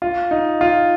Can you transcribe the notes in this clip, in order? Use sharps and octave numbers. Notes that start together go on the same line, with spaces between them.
F4
D#4
F4